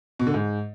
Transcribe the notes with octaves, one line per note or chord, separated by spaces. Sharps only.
B2
D3
G#2